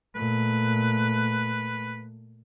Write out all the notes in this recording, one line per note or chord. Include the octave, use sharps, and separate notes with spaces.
A#2 A3 B4